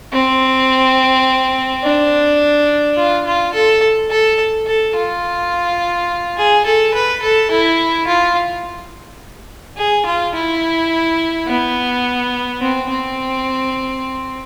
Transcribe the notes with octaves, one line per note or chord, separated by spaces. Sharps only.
C4
D4
F4
F4
A4
A4
A4
F4
G#4
A4
B4
A4
E4
F4
G#4
F4
E4
B3
C4
C4